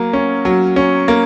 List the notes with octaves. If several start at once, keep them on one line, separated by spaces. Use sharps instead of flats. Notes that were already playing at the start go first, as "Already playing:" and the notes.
Already playing: F#3 A#3
C#4
F#3
C#4
A#3